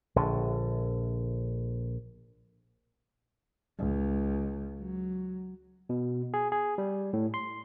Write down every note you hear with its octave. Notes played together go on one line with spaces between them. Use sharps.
A#1 D3
C#2
F#3
B2
G#4
G#4
G3
A2
C6